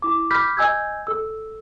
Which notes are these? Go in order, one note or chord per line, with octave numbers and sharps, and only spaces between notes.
E4 D6
B5 D6 F6 G6 B6
D#5 G#5 E6 G6 G#6
A4 E6